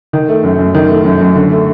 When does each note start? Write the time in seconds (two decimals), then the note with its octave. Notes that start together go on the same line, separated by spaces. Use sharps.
0.13 D#3
0.28 A3
0.43 F#2
0.59 F#2
0.74 D#3
0.89 A3
1.05 F#2
1.21 F#2
1.35 D3
1.51 A3